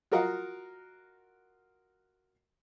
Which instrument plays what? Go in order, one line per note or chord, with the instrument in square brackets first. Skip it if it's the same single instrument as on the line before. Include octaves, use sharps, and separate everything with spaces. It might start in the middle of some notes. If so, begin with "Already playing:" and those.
[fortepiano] F4 F#4 A#4 D#5 F5 F#5